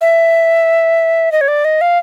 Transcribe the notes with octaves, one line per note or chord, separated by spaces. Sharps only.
E5
D#5
C#5
D5
D#5
F5